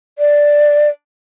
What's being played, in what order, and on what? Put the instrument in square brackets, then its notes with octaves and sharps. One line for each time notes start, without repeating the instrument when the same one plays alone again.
[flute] D5